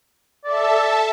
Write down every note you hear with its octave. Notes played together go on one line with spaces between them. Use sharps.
A4 D5 E5 A5